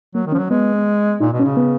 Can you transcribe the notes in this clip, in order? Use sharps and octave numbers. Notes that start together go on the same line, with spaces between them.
F#3 A#3
D#3
F3 C#4
F#3
G#3 B3
A#2 D#4
B2
C#4
C#3
B3